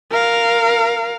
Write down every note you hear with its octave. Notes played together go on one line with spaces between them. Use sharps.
A#4 F5